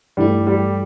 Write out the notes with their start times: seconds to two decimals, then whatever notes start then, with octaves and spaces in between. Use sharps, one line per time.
0.17 G2 E3 G3 A3 E4
0.47 G3